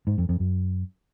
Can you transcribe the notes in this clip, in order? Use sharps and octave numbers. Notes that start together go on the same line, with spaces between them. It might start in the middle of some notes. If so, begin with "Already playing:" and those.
G#2
F2
F2
F#2